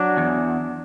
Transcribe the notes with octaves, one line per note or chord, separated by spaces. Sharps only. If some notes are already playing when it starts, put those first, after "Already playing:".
Already playing: F#3 D4
E2